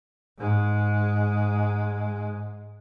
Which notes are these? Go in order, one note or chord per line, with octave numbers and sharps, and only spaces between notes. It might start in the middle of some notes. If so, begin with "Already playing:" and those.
G#2 G#3